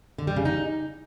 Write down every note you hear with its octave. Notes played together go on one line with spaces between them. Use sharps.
D3
G3
C#3
D#4